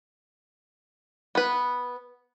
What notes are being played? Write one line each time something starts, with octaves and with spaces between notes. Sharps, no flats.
B3 B4